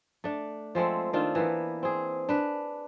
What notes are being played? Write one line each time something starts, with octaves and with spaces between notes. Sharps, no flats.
A3 D4
F3 G#3 A3 C4
D#3 C4 D4 F4
E3 A#3 B3
C4 G#4
D4 B4